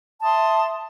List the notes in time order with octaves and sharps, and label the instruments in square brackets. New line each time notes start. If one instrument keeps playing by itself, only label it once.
[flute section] E5 A5 C6 D#6